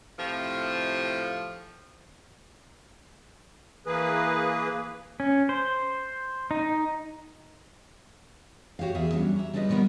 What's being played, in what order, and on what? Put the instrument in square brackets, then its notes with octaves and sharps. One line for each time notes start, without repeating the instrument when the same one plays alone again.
[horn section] A2 C3 F3
[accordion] E3 A#3 G#4 B4
[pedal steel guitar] C#4
C5
D#4
[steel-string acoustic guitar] F#4 G4 C#5 F5
E2 G#4 A#4 E5 F5
E3 F#3 G3 C#4 D4
E5 A#5
G3 D4 D#4 F4 B4 D#5
D#3 F3 G3 B3 A#4